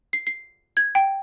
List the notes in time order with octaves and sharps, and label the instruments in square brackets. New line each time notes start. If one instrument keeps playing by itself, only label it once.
[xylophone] C7
C7
G#6
G5